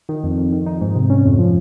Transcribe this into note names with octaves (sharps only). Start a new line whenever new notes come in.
D#3
F2
F2
D#3
D#4
G#2
C3
C#4
F2
F3